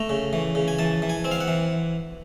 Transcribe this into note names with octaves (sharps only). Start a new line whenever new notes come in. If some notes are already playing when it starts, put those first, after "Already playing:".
Already playing: A3 A#5
C#3
E3
C#3
G#5
E3 A5
E3
G#5
C4
F5
F#5
E3